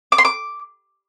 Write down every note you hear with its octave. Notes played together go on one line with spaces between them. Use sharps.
D6
C6
D6